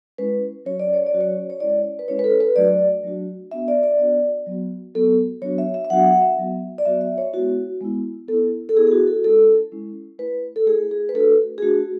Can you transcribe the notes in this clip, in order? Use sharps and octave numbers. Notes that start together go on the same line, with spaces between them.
G#3 C#4 E4 B4
F#3 C#4 F#4 C#5
D5
C#5
D5
F#3 C#4 F#4
C#5
C#5
G#3 C#4 E4 D5
B4
G#3 C#4 E4 C#5
B4
A4
B4
F#3 A3 D4 F#4 D5
F#3 A3 D4 F#4
B3 D4 F#4 E5
D5
D5
B3 D4 F#4 D5
F#3 B3 F#4
F#3 B3 F#4 A4
F#3 B3 D4 F#4 C#5
E5
E5
E5
F#3 B3 D4 F#4 F#5
F#5
E5
F#3 B3 F#4
D5
F#3 B3 F#4 E5
E5
C#5
G#3 B3 E4 F#4
G#3 B3 E4
B3 E4 A4
A4
B3 E4 G#4
G#4
F#4
A4
G#3 C#4 E4 A4
G#3 C#4 E4
A3 E4 B4
A4
A3 E4 G#4
G#4
B4
A3 D4 F#4 A4
G#4
A3 D4 F#4